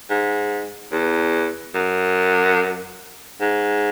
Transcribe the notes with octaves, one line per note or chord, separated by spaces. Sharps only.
G#2
E2
F#2
G#2